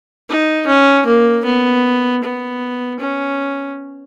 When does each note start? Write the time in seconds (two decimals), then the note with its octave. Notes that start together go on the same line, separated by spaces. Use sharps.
0.30 D#4
0.67 C#4
1.06 A#3
1.45 B3
2.23 B3
3.00 C#4